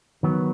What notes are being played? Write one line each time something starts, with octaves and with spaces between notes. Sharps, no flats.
D#3 F#3 B3